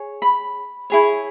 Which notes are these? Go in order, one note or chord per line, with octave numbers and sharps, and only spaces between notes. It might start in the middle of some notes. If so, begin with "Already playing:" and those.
Already playing: G#4 C#5
B5
E4 G#4 C#5